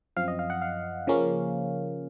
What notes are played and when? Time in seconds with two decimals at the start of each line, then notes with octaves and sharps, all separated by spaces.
0.16 F#2 F3 C4 F5
0.28 D#5
0.39 F5
0.50 F#5
0.62 F5
1.07 C#3 F3 A#3 C#4